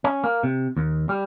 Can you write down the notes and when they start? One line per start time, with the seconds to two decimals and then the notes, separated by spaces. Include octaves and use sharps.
0.04 C#4
0.24 A#3
0.43 C3
0.77 D#2
1.09 G3